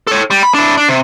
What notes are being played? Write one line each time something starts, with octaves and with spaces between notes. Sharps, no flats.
A4 C#5
G3
B5
D4 E4
D4
C3